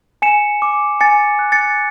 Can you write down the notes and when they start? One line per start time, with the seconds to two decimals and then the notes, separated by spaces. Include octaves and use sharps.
0.22 G#5 C#7 E7
0.62 D6
1.01 G#5 A6 C#7
1.39 F#6
1.52 A6 C#7